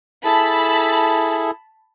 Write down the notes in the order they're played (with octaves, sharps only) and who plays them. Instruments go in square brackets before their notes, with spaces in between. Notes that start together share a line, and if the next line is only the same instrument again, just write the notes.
[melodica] E4 G#4 A4 [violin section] A5 B5